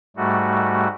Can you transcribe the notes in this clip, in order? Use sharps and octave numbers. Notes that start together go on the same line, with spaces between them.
G#2 G3 A3 F#4